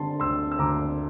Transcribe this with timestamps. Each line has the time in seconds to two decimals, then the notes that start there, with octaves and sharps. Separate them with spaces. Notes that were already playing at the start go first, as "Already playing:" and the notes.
Already playing: D3 G3 A5 C6
0.20 D2 C6 E6
0.52 E6
0.59 D2 A#5 D6